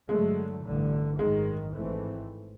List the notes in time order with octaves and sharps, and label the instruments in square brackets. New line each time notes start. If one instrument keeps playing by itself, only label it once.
[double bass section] G2 D3 F#3 A3 [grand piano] G#3
[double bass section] A1 G2 D3
[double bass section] G#1 F#2 D#3 [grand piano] G#3
[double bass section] G#1 G#2 E3 A3 C4